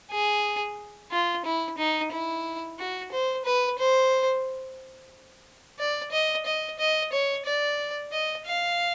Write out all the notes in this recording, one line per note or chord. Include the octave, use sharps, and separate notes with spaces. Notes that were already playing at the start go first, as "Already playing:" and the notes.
G#4
F4
E4
D#4
E4
F#4
C5
B4
C5
D5
D#5
D#5
D#5
C#5
D5
D#5
F5